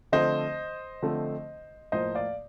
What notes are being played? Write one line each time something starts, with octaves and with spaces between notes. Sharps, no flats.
D3 F3 A3 C4 C5 D#5
D3 F3 A3 C4
A2 F3 A#3 C5 D#5
D5 F5